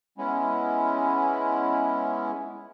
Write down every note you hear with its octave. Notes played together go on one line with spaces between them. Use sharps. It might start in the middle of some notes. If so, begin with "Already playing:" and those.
G#3 B3 C#4 E4